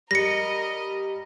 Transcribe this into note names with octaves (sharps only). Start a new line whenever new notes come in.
G3 A#4 D#5 A#6 C#7